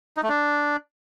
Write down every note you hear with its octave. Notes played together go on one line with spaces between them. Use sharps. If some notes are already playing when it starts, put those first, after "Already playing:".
D#4
A3
D4